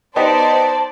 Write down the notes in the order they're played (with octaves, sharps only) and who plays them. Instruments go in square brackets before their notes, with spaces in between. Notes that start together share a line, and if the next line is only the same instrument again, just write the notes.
[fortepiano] B3 D#4 G4 [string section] C5 D5 [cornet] A5